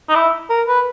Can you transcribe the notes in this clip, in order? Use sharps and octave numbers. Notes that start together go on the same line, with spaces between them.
D#4
E4
A#4
B4